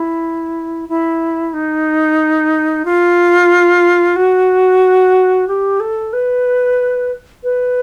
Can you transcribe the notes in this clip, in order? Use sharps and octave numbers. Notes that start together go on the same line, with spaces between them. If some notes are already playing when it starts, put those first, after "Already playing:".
Already playing: E4
E4
D#4
F4
F#4
G4
A4
B4
B4